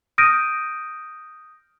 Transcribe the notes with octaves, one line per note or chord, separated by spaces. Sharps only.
D#6 F6 G6 A#6 D7 D#7